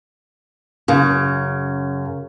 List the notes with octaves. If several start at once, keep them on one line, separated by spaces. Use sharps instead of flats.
F#2 C#3